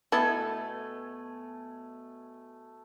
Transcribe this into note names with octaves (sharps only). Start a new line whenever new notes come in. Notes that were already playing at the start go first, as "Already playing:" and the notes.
B2 A3 B3 E4 A4 G#5